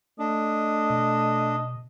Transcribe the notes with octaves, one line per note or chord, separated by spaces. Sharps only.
A3 D4 D#5
B2